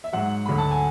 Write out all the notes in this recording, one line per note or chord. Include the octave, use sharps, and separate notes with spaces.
E5
G#2 F#3 F#5
D2 D3 F#3 B5
A5
G#5